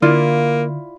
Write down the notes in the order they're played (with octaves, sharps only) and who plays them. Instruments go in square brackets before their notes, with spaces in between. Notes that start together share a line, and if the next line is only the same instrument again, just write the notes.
[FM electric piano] D3 [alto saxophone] A#3 [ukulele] E4 F4 D5